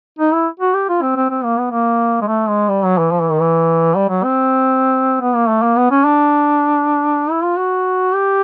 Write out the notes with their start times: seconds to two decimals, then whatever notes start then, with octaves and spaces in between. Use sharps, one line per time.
0.18 D#4
0.33 E4
0.60 F#4
0.74 G4
0.89 F4
1.02 C4
1.16 C4
1.30 C4
1.44 A#3
1.57 B3
1.71 A#3
2.21 G#3
2.27 A3
2.48 G#3
2.69 G3
2.84 F#3
2.98 E3
3.11 F3
3.21 E3
3.31 D#3
3.40 E3
3.95 G3
4.09 F#3
4.23 C4
5.21 B3
5.35 A#3
5.48 A3
5.62 A#3
5.76 B3
5.91 C#4
6.04 D4
7.31 E4
7.44 F4
7.57 F#4
8.14 G4